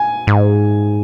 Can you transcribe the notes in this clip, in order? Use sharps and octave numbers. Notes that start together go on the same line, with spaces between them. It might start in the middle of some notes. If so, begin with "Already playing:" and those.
Already playing: G#5
G#2